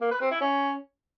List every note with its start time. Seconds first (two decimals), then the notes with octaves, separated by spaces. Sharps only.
0.01 A#3
0.11 B4
0.21 C4
0.31 E4
0.41 C#4